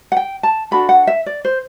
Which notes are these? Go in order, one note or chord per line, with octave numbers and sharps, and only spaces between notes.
F#5
G5
A5
D4 F#4 A4 B5
F#5
E5
D5
C5